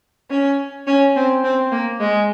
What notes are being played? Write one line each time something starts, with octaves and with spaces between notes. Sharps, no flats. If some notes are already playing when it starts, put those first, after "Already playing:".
C#4
C#4
C4
C4
A#3
G#3